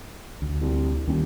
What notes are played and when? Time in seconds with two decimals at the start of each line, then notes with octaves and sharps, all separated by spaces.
0.42 D2
0.61 C2
1.08 D#1 D#2